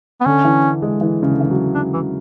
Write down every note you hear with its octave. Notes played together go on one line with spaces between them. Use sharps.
B3
D3 C#4
E3
G#3
E3
C#3
D3
E3
F#3
D4
E3